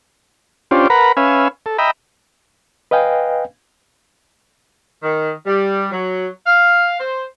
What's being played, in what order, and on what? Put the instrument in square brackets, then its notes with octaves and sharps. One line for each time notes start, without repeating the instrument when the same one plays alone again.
[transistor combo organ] C#4 D4 F4 G4 C5
A#4 B4 F#5 A#5 B5
C#4 B4 E5 F5 G#5
A4
D#5 E5 G5 A#5 B5
[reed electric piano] B4 D#5 F5 G5 G#5
[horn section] D#3
G3
F#3
F5
C5